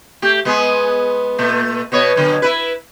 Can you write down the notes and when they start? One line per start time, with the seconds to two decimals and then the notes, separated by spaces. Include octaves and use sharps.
0.22 A3 G4
0.45 G#3 B3 G#4
1.38 A#2 A3
1.92 B2 B3 C#5
2.16 B2 D3 F#3
2.42 E4 B4